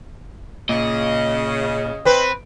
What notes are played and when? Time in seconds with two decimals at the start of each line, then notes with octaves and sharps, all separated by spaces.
0.69 A#2 C#3 D#5
2.05 C4 B4